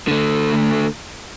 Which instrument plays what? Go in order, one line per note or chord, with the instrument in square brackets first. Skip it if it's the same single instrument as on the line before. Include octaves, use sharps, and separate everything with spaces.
[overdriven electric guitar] D3 A3